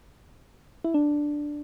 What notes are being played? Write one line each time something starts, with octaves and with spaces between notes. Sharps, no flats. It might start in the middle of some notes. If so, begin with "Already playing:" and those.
E4
D4